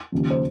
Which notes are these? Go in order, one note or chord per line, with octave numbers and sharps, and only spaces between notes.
D#2 C#3 F3
C5